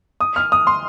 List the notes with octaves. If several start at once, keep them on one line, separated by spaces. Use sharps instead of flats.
D#6
F6
D#6
C6